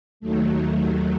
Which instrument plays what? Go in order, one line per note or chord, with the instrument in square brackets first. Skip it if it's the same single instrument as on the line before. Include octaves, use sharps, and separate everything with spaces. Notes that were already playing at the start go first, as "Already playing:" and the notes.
[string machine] D#2 D#3 F#3 A3